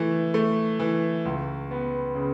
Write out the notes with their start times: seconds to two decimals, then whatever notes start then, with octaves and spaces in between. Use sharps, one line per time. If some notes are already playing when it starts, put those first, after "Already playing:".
Already playing: E3 A3
0.34 A3
0.79 E3
1.25 C#2
1.71 B3
2.15 C#3